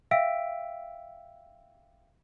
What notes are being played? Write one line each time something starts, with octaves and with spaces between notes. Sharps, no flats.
E5 F5 G5 E6 B6 D7